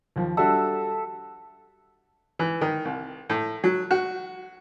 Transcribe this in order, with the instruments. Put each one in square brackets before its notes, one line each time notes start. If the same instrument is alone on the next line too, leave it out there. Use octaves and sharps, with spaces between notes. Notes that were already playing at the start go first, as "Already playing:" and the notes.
[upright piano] D#2 F3
[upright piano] G3 D4 F#4 [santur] A4 E5
[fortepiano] E3
D#3
C2
A2
F#3
F#4